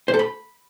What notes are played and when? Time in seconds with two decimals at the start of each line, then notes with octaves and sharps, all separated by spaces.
0.08 C5
0.14 A4
0.19 B5